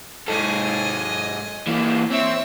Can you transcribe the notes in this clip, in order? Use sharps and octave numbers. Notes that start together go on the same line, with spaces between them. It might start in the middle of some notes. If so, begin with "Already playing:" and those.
G#2 A4 D#5 G#5
E3 A#3
C4 C#5 E5